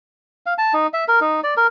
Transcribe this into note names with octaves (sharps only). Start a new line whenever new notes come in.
F5
A5
D#4
E5
A#4
D#4
D5
A#4